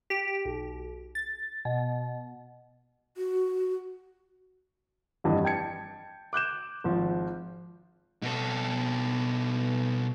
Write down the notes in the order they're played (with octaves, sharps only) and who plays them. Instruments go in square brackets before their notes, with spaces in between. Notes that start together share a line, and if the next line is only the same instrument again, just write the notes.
[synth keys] G4
B1
A6
B2
[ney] F#4
[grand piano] F1 G2 E3 D#5
G5 A5 G#6 C#7
D6 F#6 G6 E7
G#1 F3
[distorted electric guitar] B2 A4